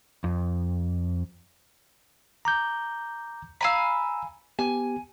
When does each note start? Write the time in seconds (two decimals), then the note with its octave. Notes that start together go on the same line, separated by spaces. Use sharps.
0.24 F2
2.45 A#5 D6 G6
3.61 F5 G#5 A#5 B5 E6
4.59 B3 G4 G#5